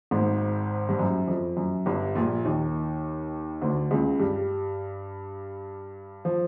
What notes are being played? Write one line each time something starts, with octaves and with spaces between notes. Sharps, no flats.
G#1 G#2
G2
F#2
F2
F#2
G1 G2
A#1 A#2
D#2 D#3
D2 D3
C#2 C#3
G2 G3
F3